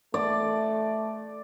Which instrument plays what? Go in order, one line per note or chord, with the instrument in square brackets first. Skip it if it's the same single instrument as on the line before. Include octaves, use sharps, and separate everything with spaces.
[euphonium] A3 [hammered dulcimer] D5